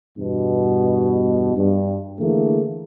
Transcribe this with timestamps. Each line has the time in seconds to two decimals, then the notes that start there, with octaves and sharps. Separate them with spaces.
0.18 E2 G2 B2
1.56 G2
2.20 D3 E3 A3 A#3 G#4